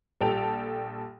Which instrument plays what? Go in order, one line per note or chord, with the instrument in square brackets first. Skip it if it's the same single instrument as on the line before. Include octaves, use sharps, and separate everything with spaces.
[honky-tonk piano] A#1 G3 A4 G5 A5 F7